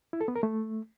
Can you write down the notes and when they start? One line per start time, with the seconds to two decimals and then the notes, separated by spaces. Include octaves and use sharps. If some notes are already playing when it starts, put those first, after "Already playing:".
0.13 E4
0.21 A4
0.28 B3
0.36 A#4
0.43 A3